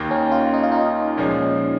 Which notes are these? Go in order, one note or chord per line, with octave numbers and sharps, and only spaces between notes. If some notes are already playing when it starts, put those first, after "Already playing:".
Already playing: D#2 D#3 A#3 D#4
C#4
F4
D#4
F4
D#4
A#2 F3 G#3 C#4